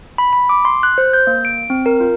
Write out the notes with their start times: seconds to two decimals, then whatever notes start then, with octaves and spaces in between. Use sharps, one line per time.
0.18 B5
0.33 B5
0.49 D6
0.65 C6
0.83 F#6
0.98 C5
1.13 G6
1.27 A#3
1.45 D7
1.70 C4
1.86 A#4
2.00 F4